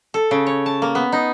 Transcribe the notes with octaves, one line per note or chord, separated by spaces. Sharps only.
A4
C#3
C#5
A5
A#3
B3
D#4